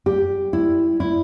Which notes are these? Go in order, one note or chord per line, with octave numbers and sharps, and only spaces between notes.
G4
E4
E4